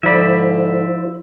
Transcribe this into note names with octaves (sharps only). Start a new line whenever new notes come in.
G#2 D3 F3 E4 C5 D5 E5 B5